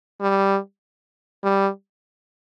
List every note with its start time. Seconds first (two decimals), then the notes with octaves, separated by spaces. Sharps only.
0.21 G3
1.44 G3